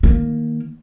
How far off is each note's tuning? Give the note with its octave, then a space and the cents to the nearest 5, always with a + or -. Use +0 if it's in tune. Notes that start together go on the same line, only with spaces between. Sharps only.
D#3 +0 A#3 +0